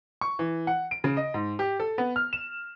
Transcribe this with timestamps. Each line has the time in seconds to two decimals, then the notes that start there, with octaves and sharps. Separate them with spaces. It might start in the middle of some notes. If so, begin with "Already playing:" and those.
0.21 C#6
0.39 E3
0.67 F#5
0.91 D7
1.04 C#3
1.17 D#5
1.34 G#2
1.59 G4
1.80 A4
1.98 B3
2.16 F6
2.33 E7